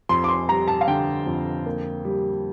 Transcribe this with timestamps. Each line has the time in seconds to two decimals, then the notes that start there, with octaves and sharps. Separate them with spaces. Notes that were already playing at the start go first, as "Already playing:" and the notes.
0.09 F2 C6
0.24 D6
0.28 C6
0.49 G3 A#5
0.68 A5
0.81 F5
0.88 D3 G5
1.26 F2
1.66 A#3
2.05 G3